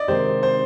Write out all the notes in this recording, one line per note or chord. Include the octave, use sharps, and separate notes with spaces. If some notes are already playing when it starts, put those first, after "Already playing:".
Already playing: D5 D#5
C3 D#3 G#3 C4 G4 C5
C5